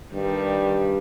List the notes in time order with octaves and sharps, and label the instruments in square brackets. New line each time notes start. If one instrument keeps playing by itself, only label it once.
[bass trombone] G2 [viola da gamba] D#3 G3